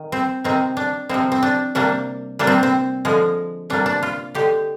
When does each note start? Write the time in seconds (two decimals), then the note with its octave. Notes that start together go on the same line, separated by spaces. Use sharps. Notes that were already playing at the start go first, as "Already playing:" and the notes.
Already playing: D#3
0.12 C4
0.44 C3 D#3 G#3 C4
0.77 D4
1.09 C3 F3 G#3 C4
1.32 C4
1.43 D4
1.75 C3 G3 A#3 D4
2.39 C3 G3 A#3 D4
2.47 C4
2.63 C4
3.05 D3 F3 G#3
3.70 C3 G3 A#3 D4
3.86 D4
4.03 F4
4.35 D3 G#3 G4